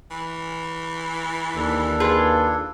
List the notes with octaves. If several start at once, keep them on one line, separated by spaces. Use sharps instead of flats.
E3
D#2 D4 A4
F4 G#4 B4